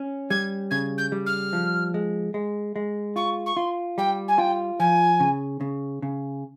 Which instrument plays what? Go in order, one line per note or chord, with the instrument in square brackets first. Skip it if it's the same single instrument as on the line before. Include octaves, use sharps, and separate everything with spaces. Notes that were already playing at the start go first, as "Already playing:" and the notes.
Already playing: [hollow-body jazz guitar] C#4
[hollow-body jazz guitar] G3 [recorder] G#6
[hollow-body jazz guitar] C#3 [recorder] G#6
[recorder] G6
[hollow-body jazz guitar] G3
[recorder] F6
[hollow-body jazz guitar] F3
G#3
G#3
G#3
[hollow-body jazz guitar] F4 [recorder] C#6
[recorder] C#6
[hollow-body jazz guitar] F4 [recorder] C6
[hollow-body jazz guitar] G3 [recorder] G5
[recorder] G#5
[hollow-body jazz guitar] F4 [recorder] G5
[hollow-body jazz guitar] F3 [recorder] G#5
[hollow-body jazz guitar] C#3
C#3
C#3